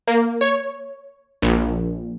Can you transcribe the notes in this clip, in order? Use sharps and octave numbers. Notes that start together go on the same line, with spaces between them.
A#3
C#5
A#1